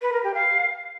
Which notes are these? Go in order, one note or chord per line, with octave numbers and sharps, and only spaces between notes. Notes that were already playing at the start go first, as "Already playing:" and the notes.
B4
A#4
G4
F5